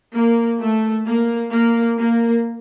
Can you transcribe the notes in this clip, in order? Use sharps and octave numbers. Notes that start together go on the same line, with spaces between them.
A#3
A3
A#3
A#3
A#3